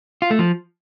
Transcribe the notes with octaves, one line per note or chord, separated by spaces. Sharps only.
F4
A3
F3